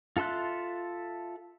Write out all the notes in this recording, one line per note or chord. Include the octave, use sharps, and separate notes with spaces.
F4 A4 E5 C6 F#6